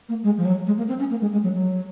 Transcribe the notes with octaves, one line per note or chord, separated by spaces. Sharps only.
A#3
G#3
F3
F#3
G#3
A#3
C4
C#4
A#3
G#3
G#3
F#3
F#3